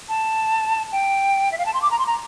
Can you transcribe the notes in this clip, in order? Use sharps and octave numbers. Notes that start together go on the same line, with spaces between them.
A5
G5
E5
F5
A5
C6
D6
A#5
C6
A#5